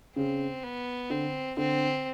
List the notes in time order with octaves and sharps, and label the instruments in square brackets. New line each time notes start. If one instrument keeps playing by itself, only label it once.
[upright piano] C#3 [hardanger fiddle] C4
[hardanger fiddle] B3
[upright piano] D3 [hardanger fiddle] C4
[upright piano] D3 [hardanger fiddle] C4